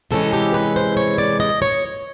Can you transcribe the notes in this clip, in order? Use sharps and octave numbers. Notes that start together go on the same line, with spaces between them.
C3 E3 G#3 C#4 A4
G4
B4
C5
C#5
D5
D#5
C#5